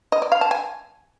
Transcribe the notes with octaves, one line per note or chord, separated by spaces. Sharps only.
D#5
D5
F5
A5
G#5